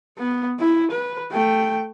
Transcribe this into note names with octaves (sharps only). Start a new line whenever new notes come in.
B3
E4
B4
A3 G5